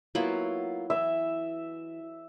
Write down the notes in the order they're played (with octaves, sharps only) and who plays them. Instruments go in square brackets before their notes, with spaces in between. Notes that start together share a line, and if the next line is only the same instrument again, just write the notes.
[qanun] F#3 B3 E4 [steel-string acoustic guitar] A#3 F4
[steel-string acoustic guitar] E3 [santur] E5